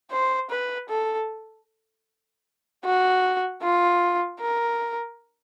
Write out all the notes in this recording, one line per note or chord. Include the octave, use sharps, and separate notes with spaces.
C5
B4
A4
F#4
F4
A#4